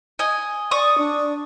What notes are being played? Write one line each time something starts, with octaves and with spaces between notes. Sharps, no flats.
D#5 G#5
D5 C#6 D#6
D4